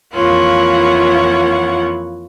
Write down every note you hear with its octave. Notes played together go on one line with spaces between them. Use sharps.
F2 E3 A#3 F4 C#5 F#5